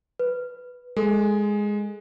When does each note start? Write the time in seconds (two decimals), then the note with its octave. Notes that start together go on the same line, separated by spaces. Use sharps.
0.19 B4
0.97 G#3 A4